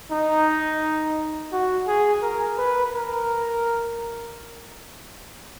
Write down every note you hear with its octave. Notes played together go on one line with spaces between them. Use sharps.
D#4
F#4
G#4
A#4
B4
A#4